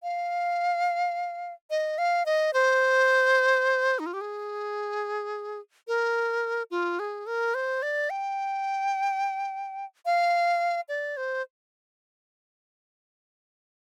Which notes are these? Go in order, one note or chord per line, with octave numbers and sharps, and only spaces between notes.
F5
D#5
F5
D#5
C5
D#4
F4
G4
G#4
A#4
F4
G#4
A#4
C5
D5
G5
F5
D5
C5